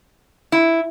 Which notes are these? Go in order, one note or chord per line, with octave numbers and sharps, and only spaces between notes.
E4